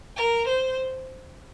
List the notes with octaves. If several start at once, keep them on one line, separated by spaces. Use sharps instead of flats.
A#4
C5